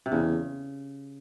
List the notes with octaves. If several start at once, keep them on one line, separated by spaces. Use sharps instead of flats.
C3
E2 C#3